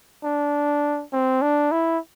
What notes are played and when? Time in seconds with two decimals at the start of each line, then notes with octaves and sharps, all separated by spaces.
0.24 D4
1.13 C4
1.42 D4
1.72 E4